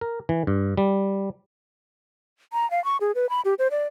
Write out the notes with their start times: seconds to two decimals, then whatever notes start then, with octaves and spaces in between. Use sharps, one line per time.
0.01 A#4
0.29 E3
0.47 G2
0.77 G3
2.53 A#5
2.71 F5
2.85 C#6
3.01 G#4
3.15 B4
3.29 B5
3.45 G4
3.59 C5
3.71 D5